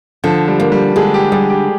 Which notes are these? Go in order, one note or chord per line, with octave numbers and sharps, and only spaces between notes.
D3 F3
G3
A#3
G3
D3 G#3
G4
G3 G#4
G4